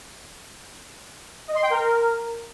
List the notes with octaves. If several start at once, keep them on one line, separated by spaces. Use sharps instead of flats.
D#5
C6
G5
A#4